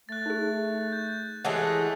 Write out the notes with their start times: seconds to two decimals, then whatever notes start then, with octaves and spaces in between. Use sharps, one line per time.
0.09 A3 F#6 A6
0.26 D#4 G#4
0.93 G6
1.45 E3 G#3 A3 G4 C#5 F#5 D#6 F#6